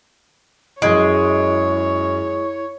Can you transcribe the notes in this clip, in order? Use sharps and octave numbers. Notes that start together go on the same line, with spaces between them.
F#2 G#3 E4 C#5 G#6 D7